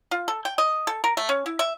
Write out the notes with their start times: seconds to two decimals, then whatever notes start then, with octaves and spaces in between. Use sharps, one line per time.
0.11 F4
0.28 A4
0.45 G5
0.58 D#5
0.87 A4
1.04 A#4
1.17 A3
1.29 C#4
1.46 E4
1.59 E5